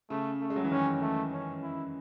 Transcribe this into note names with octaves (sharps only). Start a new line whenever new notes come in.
C#3 A3
A3
G#3
F#3
E3
D#3 C#4
A3
C#4
E4